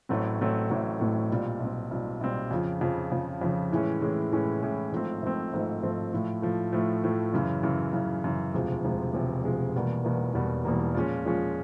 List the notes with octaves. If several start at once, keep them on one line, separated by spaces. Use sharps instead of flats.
A1 A2 F#3 A3 C4
A1 A2 F#3 A3 C4
A1 A2 F#3 A3 C4
A1 A2 F#3 A3 C4
B1 A#2 G3 C4
B1 A#2 G3 C4
B1 A#2 G3 C4
B1 A#2 G3 C4
F2 C#3 F3
F2 C#3 F3
F2 C#3 F3
F2 C#3 F3
A2 E3 G#3 C#4
A2 E3 G#3 C#4
A2 E3 G#3 C#4
A2 E3 G#3 C#4
G#1 G#2 F3 A3 C4
G#1 G#2 F3 A3 C4
G#1 G#2 F3 A3 C4
G#1 G#2 F3 A3 C4
A2 F3 A3
A2 F3 A3
A2 F3 A3
A2 F3 A3
F#2 C#3 E3
F#2 C#3 E3
F#2 C#3 E3
F#2 C#3 E3
E1 D2 C3 F3 G#3
E1 D2 C3 F3 G#3
E1 D2 C3 F3 G#3
E1 D2 C3 F3 G#3
E1 E2 B2 G3 A#3
E1 E2 B2 G3 A#3
E1 E2 B2 G3 A#3
E1 E2 B2 G3 A#3
A#2 F3 G#3 C#4
A#2 F3 G#3 C#4